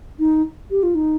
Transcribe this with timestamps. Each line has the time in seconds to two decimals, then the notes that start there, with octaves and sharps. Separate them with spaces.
0.19 D#4
0.71 G4
0.83 F4
0.95 D#4